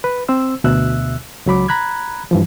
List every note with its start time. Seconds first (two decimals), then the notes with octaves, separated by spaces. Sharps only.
0.04 B4
0.29 C4 C5 E6
0.64 D2 B2 E5 E6 F#6
1.46 C#2 F#3 B5 D6
1.68 A#5 B5 F#6 G#6
2.31 G2 E3 F3